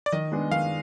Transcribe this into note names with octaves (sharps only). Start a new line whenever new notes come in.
D5
D#3 D#5
G#3 B3 D4 G#4
D#3 F5